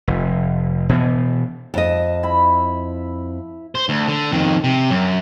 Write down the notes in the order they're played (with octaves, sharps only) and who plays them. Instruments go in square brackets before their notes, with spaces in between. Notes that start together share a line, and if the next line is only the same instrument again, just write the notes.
[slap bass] F1
B2 E3 B3
[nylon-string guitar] F2 D#5 [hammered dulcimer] A5
[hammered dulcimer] E4 B5
[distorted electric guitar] C5
D2
D3
F2 D#3
C3
F#2